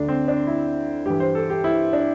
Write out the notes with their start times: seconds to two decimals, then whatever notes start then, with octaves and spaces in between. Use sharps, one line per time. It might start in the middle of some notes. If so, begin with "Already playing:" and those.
Already playing: D2 D3 D4
0.08 C4
0.28 D4
0.47 E4
1.06 G2 E3 G4
1.20 C5
1.35 A4
1.50 G4
1.64 E4
1.93 D4